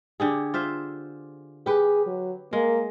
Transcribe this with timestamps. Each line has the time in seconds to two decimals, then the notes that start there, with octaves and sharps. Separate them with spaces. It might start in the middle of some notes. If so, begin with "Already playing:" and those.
0.20 D3 G4 G#4
0.54 F4 C5 E5
1.66 G4 G#4 B4
2.06 F#3
2.53 G#3 A#3